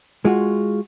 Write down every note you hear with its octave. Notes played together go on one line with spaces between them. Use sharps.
G#3 F4 F#4